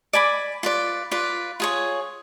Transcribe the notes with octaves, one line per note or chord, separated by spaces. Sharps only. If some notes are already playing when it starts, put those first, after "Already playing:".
D5 G#5 B5 D6
F4 B4 D5
F4 B4 D5
F4 G#4 C#5